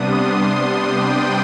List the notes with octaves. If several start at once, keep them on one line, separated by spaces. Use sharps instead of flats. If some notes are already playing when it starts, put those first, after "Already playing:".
Already playing: C3 G3 B3 D4 C6 D#6
G5